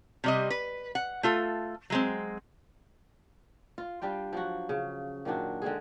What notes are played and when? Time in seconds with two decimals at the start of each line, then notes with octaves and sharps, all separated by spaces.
0.24 C3 G3 D#5
0.50 B4
0.95 F#5
1.23 A3 F4 A4
1.90 F#3 G#3 C4
3.78 F4
4.02 G3 D4 F4 G5
4.33 F3 F#3 F#4
4.69 C#3
5.25 A#2 D#3 F#3 D4
5.62 D3 G#3 C4 G#4